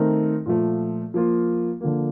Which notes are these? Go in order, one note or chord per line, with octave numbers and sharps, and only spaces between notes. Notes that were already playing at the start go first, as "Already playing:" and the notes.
Already playing: D#3 A3 C4 D#4 A#4
A#2 F3 A3
F3 A#3 F4
D3 F3 A#3